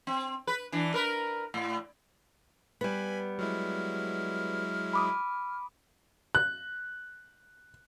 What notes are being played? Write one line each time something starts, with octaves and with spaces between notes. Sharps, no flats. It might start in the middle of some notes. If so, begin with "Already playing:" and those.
C4
B4
E3 D4
A#4 B4
A2
G3 B3 G#5 B5
F#3 G#3 E4 F6
B5 D6 D#6
F#6